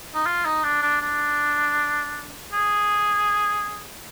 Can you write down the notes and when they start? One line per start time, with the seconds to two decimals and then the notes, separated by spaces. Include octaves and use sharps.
0.14 D#4
0.26 F4
0.45 D#4
0.64 D4
0.82 D4
1.01 D4
2.53 G#4